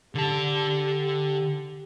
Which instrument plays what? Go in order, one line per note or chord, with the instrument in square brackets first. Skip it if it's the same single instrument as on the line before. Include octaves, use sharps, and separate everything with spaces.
[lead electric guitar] D3 A5 [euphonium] G4